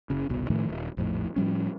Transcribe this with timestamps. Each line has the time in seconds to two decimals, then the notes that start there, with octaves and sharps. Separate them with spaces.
0.10 F#1 C#3
0.29 G1 C2 B2
0.50 A2 D#3 F3 A3
0.69 D#1
0.97 A#1 F2 A2
1.36 A2 F3 G3 C#4